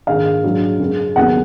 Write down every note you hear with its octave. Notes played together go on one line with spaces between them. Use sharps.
A#1 G#2 D#3 G#3 F5
A#1 G#2 F#3
F#2 C#3 G#3
D#2 C#3 F#3 B3 F#5